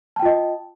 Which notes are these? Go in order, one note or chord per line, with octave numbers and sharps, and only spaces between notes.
F4 D#5 G5 A5